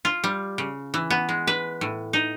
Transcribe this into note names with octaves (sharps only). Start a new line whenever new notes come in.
F4
G3
C#3
E3
B3
G#3
B4
A2
D#4